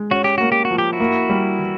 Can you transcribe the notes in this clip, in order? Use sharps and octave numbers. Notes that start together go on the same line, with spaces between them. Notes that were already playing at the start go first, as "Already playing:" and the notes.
Already playing: G#3
C#4 F#4
G4
A#3 F#4
G4
F#4
F3
G4
E4 F#4
A#3
G3
E3